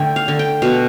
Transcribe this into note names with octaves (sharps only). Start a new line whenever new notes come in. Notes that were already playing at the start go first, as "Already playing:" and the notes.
Already playing: D3 A3 G5
F5
D3
G5
B2 F5